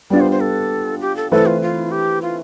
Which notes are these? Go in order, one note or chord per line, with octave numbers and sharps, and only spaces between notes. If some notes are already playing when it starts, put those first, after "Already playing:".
G3 B3 D4 F4 D5
C5
C5
A4
G4
A4
E3 A3 C4 E4 A4 B4
F4
F4
G4
F4